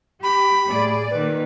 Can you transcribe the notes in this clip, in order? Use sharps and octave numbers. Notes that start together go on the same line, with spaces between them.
G4 B5
A2 G#4 D5
A#2 D#3 B4